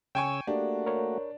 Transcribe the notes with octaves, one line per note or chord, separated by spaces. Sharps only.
C#3 C#5 G5 G#5 C#6 E6
A3 A#3 D4 F#4 G4
A#4 C#5